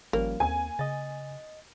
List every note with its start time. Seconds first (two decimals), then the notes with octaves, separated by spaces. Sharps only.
0.13 G#1 F3 G3 A#3 C#4
0.40 D#2 C4 G#5
0.79 C#3 D#5 A6